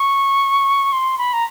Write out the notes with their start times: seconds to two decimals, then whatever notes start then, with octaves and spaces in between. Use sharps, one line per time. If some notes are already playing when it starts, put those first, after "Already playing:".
Already playing: C#6
0.92 C6
1.18 B5
1.33 A#5